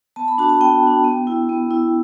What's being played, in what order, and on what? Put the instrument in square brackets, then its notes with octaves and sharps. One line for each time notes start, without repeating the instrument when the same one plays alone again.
[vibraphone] B3 A5
B5
D4 F#4 A5
A5
B3 G5
D4 F#4
B3
E4
B3
E4